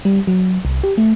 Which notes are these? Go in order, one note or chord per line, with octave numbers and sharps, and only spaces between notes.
G3
F#3
C2
G4
A3